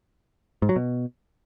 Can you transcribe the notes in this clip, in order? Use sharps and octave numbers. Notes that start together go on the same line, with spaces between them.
G#2
F#3
B2